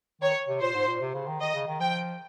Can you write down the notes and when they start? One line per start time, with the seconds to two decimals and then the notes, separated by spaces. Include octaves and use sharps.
0.21 D#3 C#5
0.48 C3
0.61 A#2 C5
0.74 G#2
0.87 A#2
1.01 C3
1.14 C#3
1.28 D#3
1.41 D#3 D#5
1.54 C#3
1.67 D#3
1.80 F3 G5